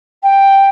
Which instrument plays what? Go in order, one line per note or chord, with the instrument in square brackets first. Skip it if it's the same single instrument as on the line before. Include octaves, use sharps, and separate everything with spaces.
[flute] G5